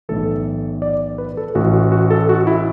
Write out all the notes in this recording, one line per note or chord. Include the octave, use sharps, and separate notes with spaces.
B1 A2 E3 A4
D5
B4
A4
A1 A2 E3 F#4
F#4
F#4
A4
F#4
E4